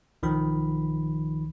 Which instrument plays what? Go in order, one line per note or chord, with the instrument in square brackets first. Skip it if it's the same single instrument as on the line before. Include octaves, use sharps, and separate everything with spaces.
[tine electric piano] B1 D#3 F3 B5